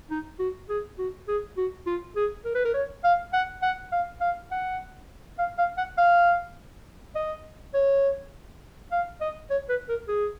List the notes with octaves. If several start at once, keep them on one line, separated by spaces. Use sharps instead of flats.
D#4
F#4
G#4
F#4
G#4
F#4
F4
G#4
A#4
B4
A#4
C#5
F5
F#5
F#5
F5
F5
F#5
F5
F5
F#5
F5
D#5
C#5
F5
D#5
C#5
B4
A#4
G#4